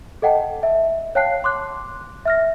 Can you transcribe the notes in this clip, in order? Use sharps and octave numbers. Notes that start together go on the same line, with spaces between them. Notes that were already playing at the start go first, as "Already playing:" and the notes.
A4 D#5 F#5 G5 A5
E5
C#5 F5 G5 A5 F#6 C7
C6 D6 F#6
E5 F6 A#6